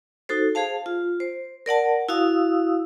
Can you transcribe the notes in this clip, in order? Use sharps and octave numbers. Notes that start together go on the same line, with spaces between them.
D#4 F#4 A4 C5
G#4 C5 F5 A5
F4
C5
A#4 D5 F#5 A5
E4 F#4 F5 D#6 E6